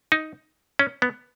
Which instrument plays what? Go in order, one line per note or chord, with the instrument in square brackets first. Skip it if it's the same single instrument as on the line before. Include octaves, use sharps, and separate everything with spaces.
[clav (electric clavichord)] D#4
C#4
B3